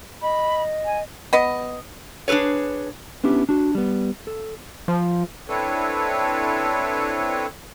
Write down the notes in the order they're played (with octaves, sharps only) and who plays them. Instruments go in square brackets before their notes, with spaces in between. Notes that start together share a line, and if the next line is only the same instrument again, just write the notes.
[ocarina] D#5 [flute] B5
[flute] G#5
[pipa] B3 D#5
[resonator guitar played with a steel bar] D4 G#4 A4 B4 C#5
[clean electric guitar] B3 C#4 D4 E4 G4
D4 F#4
G3 B3
A4
[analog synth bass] F3
[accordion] C4 D4 E4 A4 B4 C#5